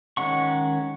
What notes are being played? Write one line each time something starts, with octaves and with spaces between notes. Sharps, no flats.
D#3 G#3 C#4 F#5 C#6